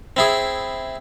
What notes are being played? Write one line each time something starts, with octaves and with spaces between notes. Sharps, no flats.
C4 E4 G#4